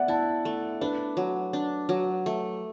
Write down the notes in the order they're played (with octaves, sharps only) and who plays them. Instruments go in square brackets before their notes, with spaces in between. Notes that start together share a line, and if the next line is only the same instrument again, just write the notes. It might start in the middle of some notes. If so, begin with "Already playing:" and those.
Already playing: [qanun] B3 [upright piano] D5 E5 F#5
[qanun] E4 [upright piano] A5
[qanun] A3
[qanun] D4 [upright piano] B4
[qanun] F#3
D4
F#3
A3